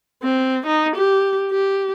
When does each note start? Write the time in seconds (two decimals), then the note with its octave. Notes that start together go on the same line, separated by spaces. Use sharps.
0.23 C4
0.66 D#4
0.96 G4
1.51 G4